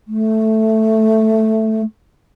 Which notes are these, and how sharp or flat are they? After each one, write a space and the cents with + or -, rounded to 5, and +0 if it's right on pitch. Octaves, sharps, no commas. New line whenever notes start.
A3 +0